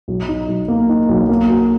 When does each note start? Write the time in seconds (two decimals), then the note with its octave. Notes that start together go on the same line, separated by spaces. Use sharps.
0.08 B1
0.29 D#4
0.48 B1
0.68 A#3
0.89 D#4
1.09 B1
1.29 A#3
1.49 F#4